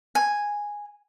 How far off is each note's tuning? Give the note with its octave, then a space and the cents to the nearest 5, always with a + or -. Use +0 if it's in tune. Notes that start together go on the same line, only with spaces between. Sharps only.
G#5 -5